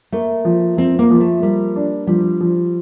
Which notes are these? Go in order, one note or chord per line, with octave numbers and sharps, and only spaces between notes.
A3 A#3
F3
F3 C4
A#3
F3
A3
G3 A#3
D4
F3 G3
F3